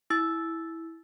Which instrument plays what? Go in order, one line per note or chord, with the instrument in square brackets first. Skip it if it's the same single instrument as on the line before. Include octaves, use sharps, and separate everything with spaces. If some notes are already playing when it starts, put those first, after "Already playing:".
[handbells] E4 E6 A6